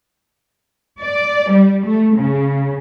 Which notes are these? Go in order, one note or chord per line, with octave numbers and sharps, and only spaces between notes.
D5
G3
A3
C#3